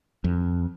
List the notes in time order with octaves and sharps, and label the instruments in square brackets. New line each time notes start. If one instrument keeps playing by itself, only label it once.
[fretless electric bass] F2